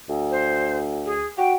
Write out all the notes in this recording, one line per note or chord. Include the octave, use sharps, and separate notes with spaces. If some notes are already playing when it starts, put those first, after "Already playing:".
D2
C5
G#4
F#4 G5